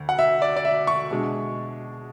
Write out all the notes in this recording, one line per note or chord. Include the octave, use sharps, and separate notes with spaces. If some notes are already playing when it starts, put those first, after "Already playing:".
Already playing: D2
F#5
E5
D5
D5
E5
C#6
B2 G#3 D4